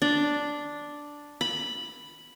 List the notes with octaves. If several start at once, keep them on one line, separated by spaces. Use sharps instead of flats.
D4
B5